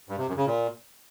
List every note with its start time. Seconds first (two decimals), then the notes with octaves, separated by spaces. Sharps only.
0.09 G2
0.18 C3
0.27 F#2
0.36 C#3
0.46 A#2